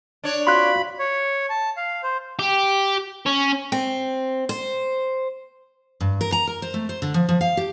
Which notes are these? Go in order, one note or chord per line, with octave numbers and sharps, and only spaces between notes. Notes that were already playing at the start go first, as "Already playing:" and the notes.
D4 C#5
C4 F4 F#4 B5 C6 F#6
C#5
A5
F5
C5
G4
C#4
C4
C5
G2
A#4
A#5
A#4
C5
A3
C5
D3
F3
F3
F5
G4